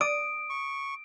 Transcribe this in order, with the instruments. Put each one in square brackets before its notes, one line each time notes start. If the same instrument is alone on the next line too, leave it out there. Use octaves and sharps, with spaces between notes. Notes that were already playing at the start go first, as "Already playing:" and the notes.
[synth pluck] D5 [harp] D#6 [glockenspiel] D7
[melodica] C#6